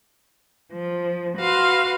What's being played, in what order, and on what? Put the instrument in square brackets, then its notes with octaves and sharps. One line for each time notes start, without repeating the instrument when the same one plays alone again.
[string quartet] F3
F#4 B4 F5 C6